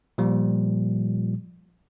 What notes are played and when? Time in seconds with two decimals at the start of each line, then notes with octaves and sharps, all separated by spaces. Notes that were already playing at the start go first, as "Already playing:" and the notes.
0.18 A#2 F3 G3